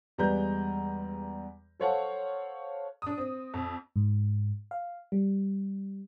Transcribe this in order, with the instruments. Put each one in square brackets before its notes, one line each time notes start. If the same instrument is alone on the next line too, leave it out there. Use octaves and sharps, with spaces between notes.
[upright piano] E2 G3 G#3 B4 A#5 G6
A4 C5 C#5 F5 F#5 A5
[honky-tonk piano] D4 D#6
C4
F2
[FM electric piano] G#2
F5
G3